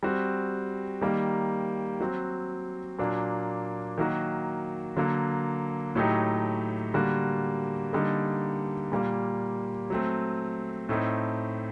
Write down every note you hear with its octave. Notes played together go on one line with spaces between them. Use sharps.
G3 C4 F#4
D#3 G3 A#3
F#3 C4 F#4
A#2 F#3 A#3 D4
D#3 F#3 A#3 F#4
D3 F#3 A#3
A2 F#3 A3 D#4 G4
D3 G3 A#3 F#4
D3 G3 A#3 D#4
A#2 G3 A#3
F#3 A3 C4
A2 A3 C4 D#4